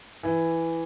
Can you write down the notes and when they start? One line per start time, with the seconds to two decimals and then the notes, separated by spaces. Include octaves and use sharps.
0.23 E3